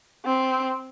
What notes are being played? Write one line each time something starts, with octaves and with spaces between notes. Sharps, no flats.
C4